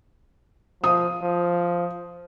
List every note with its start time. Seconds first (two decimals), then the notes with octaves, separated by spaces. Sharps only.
0.84 F3 D#6
1.22 F3